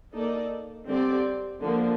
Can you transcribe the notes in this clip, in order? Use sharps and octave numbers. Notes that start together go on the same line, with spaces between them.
A#3 D#4 A4 D5
D3 G3 C4 G4 D5
D3 F3 A#3